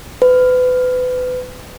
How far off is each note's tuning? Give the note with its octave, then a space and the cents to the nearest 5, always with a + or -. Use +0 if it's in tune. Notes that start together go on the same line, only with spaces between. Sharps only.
B4 +30